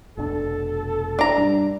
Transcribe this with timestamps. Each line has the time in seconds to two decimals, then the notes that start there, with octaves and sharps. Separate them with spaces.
0.17 F1 B2 D4 A4
1.19 D4 A#5
1.36 G2